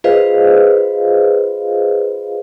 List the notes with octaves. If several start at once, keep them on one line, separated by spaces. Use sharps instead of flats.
F4 G#4 B4 C5 D#5 F5